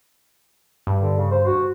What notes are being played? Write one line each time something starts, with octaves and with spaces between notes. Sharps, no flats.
G2
D3
C#3
C5
F#4